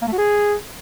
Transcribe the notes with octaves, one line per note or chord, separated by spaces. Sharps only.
A#3
A3
F#4
G#4